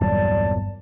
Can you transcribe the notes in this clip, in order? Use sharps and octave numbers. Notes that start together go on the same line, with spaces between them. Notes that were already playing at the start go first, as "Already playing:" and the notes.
G1 E2 A#2 F#3 G3 D5 A5